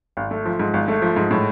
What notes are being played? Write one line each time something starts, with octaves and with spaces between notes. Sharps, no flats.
G#1
A3
F3
G#2
G#1
A3
F3
G#2
A2